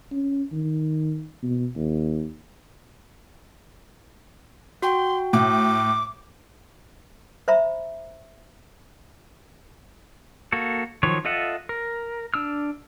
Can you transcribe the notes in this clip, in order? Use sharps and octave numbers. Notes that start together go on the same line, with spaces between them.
C#4
D#3
B2
D#2
F#4 G5 C6
A2 D6
C5 E5 A#5 B5
A#3 F#4 A4
D#3 F3 F#3 C#5
F4 A4 D#5 E5 F#5
A#4
D4 E6 F6